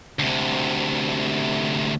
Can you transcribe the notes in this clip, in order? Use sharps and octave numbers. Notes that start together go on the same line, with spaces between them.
D2 C3